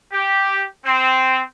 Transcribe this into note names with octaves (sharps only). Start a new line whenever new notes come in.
G4
C4